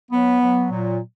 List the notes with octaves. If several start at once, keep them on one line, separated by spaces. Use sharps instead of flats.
F#3 B3
F#3
A#2